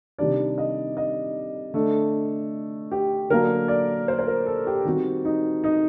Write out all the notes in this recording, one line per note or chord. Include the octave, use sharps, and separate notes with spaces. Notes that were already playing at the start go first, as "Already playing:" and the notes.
C3 D#3 G3 D4 D5
D#5
D#5
D3 A3 D4
G4
D3 F#3 A#3 D4 A#4
D5
C5
C5
A#4
A4
G4
D#3 G3 C4 F#4
D#4
D#4